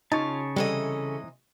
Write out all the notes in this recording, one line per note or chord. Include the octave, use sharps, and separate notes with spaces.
C#3 D#4 F4 C#5 A5
C3 E3 G3 A4 D#5